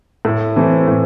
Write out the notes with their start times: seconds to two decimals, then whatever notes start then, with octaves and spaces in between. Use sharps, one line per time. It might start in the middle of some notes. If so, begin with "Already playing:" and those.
0.25 A2
0.56 E3 A3 C4
0.88 A2